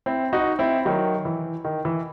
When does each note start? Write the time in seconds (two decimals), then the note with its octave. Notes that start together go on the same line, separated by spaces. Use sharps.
0.06 C4 E4
0.33 D#4 F#4
0.59 C4 E4
0.85 D#3 F#3
1.25 E3
1.65 D#3
1.85 E3